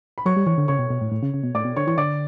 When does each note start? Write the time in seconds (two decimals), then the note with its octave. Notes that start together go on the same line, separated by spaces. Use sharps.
0.18 B5
0.26 F#3 C#5 C#6
0.36 G3
0.46 E3 C#5 C#6
0.58 D3
0.68 C#3 C#5 C#6
0.79 B2
0.90 B2
1.01 A2
1.12 A2
1.23 C#3
1.34 C#3
1.43 B2
1.55 A2 D5 D6
1.65 B2
1.76 D3 C#5 C#6
1.87 E3 C#6
1.98 D3 D5 D6